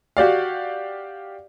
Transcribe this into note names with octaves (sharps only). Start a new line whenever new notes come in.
F#4 G4 D5 F5